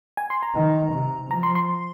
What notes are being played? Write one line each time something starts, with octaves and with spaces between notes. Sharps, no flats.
G#5
C6
A#5
D#3
C3
F3 A#5
C6
C6